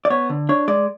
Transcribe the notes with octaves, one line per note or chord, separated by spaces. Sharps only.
D5
B3 C#5
D3
D4 C#5
G#3 D5